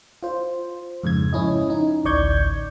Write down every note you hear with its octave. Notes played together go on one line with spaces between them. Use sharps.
F4 C5
F2 G#2 C#3 G#6
C#4 E4 D#5
D#4
A1 D2 D5 C#6 G6 G#6